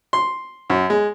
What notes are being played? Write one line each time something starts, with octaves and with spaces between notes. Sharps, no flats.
C6
F#2
G#3